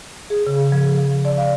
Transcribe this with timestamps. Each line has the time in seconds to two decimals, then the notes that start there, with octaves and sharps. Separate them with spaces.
0.30 G#4
0.47 C#3
0.72 F3
1.25 D5
1.38 F5